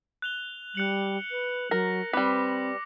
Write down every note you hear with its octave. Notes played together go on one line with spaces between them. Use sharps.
F#6 F7 G7
G3 F#6 C#7 F#7
B4
F#3 A#4 A#6
G3 C4 B4 D6